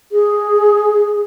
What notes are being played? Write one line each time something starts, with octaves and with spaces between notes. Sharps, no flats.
G#4